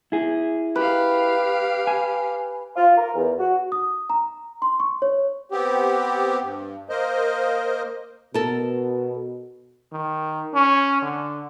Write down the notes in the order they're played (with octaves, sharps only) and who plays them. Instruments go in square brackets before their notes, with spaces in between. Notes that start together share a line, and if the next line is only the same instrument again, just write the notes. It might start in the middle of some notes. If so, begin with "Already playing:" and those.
[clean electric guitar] E4 G#4
[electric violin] G4 F5 [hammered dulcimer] B4
[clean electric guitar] G#5
[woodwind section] F4
A#4
E2
F#4
[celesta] D#6
A#5
C6
C#6
C#5
[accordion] B3 C4 G4
G2
A#3 A#4 C5 D#5
[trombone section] B2 [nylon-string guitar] A4 A#4
[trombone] D#3
C#4
D3